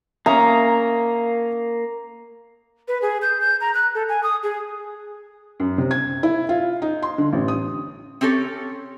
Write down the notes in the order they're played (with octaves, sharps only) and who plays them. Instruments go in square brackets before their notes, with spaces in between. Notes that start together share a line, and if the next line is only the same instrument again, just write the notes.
[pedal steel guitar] A#3 [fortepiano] C#4 E5 D#6 [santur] A#5
[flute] B4
G#4
G6
G6
A#5
F#6
A4
G#5
D#6
G#4
[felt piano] F#2
C3
G#6
E4
F4
D#4
C6
D3
A1
D#6
[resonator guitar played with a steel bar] C4 C#4 G4 A4 C#5